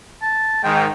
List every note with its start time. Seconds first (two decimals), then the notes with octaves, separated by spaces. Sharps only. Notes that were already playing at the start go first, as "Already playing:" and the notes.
0.22 A5
0.63 G#2 D#3 G5